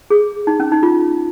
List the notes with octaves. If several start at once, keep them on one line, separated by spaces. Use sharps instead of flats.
G#4
D#4
C#4
D#4
F4